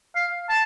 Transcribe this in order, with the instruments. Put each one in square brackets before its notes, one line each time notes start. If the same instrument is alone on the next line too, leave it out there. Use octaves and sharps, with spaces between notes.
[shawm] F5
A5